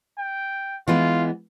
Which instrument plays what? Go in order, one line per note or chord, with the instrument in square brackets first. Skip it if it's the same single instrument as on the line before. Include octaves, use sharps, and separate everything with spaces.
[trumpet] G5
[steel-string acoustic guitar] E3 G#3 B3 [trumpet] F4